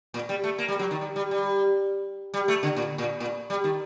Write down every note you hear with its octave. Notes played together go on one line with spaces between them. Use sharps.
A#2
G3
A3
A#3
G3
F#3
D#3
G3
G3
G3
G3
A3
D3
A#2
A#2
A#2
G3
D#3